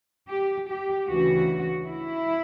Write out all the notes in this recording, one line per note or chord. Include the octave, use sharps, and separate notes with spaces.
G4
G4
D2 C#3 E3 F#4
E4